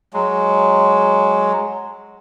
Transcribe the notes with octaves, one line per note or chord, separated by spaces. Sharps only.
F#3 G#3